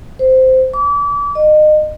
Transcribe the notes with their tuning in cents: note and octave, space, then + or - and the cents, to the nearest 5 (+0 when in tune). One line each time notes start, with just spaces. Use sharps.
C5 -10
D6 -35
D#5 -30